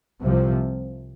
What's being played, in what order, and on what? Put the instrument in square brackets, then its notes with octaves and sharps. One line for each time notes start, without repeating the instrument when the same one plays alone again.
[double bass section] C2 C3 F3